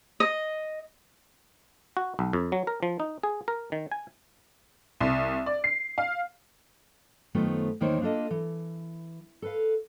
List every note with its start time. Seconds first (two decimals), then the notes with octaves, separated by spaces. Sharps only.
0.20 D#5
1.97 F#4
2.19 B1
2.33 F2
2.52 F#3
2.67 A#4
2.83 F3
3.00 D#4
3.23 G#4
3.48 A#4
3.72 D#3
3.92 G#5
5.00 C2
5.46 D5
5.64 C7
5.98 F5
7.34 F#2 D#3 A3 B3 F4 C5
7.81 E2 D#3 A#3 D#4 C5 C#5
8.01 A#3 D4 F4 A4 D#5
8.31 E3
9.42 A4 B4 F5